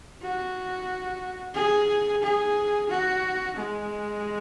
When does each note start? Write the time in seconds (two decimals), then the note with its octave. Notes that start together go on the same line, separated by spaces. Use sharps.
0.22 F#4
1.55 G#4
2.23 G#4
2.89 F#4
3.56 G#3